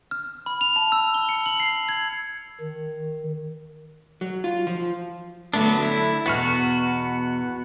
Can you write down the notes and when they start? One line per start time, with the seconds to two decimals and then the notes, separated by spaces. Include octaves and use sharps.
0.11 F6
0.46 B5
0.61 F7
0.76 A5
0.92 E6
1.14 G7
1.29 C#7
1.46 F#7
1.60 C7
1.89 G#6
2.61 D#3
4.21 F#3
4.44 F4
4.67 F3
5.54 D3 F#3 A3 B3 D4
5.82 E4
6.26 E2 B2 B3 F#4 F6